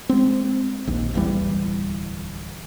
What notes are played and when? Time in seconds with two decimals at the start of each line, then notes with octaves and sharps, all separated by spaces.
0.09 G#3 C4
0.87 A#1 D#2
1.14 D1 E2 E3 G3